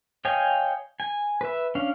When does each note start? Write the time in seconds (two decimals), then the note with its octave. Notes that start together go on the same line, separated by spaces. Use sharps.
0.25 C#5 D#5 F5 G5 G#5
1.00 G#5
1.41 B4 E5
1.75 C#4 D4 F5